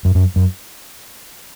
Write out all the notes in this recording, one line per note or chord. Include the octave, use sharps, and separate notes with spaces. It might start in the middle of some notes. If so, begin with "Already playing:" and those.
F#2
F#2
F#2